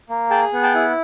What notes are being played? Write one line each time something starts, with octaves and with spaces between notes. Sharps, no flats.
A#3
G#4 G5 A5
B3
G5 A5
E4